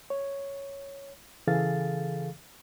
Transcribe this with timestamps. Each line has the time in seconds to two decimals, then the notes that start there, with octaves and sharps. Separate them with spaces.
0.10 C#5
1.47 C#3 E3 G#4 A4 F5 A6